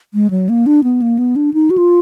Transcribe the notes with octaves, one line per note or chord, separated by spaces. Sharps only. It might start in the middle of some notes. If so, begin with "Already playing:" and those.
G#3
F#3
A#3
D4
B3
A#3
B3
D4
D#4
F#4
F4